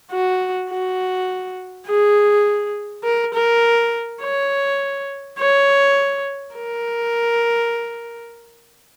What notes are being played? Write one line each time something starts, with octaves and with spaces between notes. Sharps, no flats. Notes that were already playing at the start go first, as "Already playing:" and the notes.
F#4
F#4
G#4
A#4
A#4
C#5
C#5
A#4